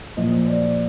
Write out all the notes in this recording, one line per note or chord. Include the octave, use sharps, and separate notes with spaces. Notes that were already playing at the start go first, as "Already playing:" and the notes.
A#2 F3 D#5
D5